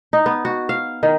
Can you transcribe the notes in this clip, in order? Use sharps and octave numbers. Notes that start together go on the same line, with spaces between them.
D#4
B3
F#4
F5
D#3